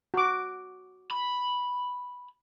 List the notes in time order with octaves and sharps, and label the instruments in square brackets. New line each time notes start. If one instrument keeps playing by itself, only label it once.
[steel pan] F#4 D6
[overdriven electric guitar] B5